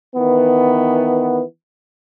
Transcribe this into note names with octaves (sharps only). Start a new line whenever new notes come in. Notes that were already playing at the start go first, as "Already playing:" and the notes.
D#3 E3 B3